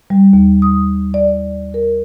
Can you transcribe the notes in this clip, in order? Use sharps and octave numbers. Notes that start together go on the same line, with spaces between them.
G3
D#2
D#6
D5
A#4